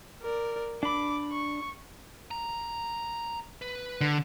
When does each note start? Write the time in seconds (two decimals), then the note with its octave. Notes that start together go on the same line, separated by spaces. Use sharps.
0.22 A#4 D5
0.83 D4 B5 D6
1.32 C#6
2.31 A#5
3.62 B4
4.01 D3